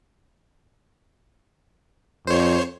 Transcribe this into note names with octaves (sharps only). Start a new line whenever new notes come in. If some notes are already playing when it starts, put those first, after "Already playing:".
F2 C5 C#5